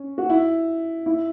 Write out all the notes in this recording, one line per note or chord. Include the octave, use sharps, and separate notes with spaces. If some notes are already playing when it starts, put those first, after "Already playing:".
Already playing: C#4
F#4
E4
E4